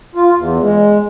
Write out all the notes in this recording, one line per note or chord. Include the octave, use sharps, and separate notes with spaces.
F4
E2
G#3